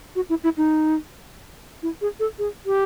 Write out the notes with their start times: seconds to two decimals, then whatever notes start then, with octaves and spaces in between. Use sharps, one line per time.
0.15 F#4
0.29 E4
0.44 E4
0.57 D#4
1.82 E4
2.01 G#4
2.20 A4
2.38 G#4
2.66 G4